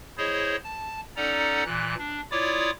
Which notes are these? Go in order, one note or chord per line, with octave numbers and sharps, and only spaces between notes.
E4 G#4 C5 C#5 D#5
A5
C#4 D#4 A4 D5 F#5 A#5
A#2 E3 F#6
D4
E4 F4 C#5 D5 D6 D#6